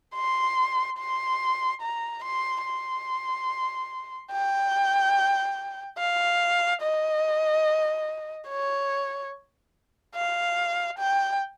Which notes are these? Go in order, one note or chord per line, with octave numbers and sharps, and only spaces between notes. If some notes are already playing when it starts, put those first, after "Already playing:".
C6
C6
A#5
C6
C6
G5
F5
D#5
C#5
F5
G5